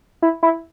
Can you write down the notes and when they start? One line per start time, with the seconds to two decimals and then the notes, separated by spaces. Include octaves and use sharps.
0.22 E4
0.43 E4